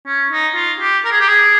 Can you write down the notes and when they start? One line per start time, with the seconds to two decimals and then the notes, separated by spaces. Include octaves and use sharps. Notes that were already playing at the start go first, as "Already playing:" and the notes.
0.06 C#4
0.31 D#4
0.55 F4
0.80 G4
1.05 A#4
1.12 G#4
1.20 G4
1.28 G#4